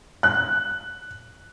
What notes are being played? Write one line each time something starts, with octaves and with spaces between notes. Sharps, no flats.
F#6